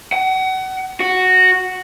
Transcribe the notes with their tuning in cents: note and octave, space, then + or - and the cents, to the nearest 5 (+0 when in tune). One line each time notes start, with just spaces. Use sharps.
F#5 +30
F#4 +0